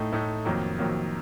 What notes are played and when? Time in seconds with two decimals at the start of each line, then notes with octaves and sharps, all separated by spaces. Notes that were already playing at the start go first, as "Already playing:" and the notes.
Already playing: A2 A3 D#4
0.12 A2 A3 D#4
0.45 F2 D#3 F#3 A#3
0.79 F2 D#3 F#3 A#3